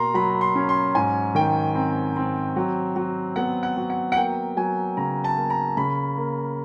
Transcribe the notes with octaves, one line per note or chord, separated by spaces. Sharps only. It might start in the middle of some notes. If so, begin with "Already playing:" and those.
Already playing: B2 A#3 A#5 C6
F#3 B5
C6
C#4
C6
G#2 G#5
D#3 G5
C4
C4
F#3
F#3
B3 F#5
F#5
F#3
F#5
F#5
A#3 G5
F#3 G#5
C#3 A#5
A5
A#3
A#5
C#3 B5
A#3